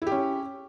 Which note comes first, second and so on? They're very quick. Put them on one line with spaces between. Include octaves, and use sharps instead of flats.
E4 G4 C#4